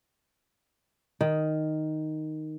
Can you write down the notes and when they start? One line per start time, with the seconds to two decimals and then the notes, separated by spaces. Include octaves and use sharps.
1.21 D#3